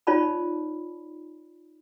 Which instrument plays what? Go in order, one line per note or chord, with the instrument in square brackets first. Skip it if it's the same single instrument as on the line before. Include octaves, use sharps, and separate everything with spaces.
[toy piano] D#4 F4 C#5 D5 A5 B5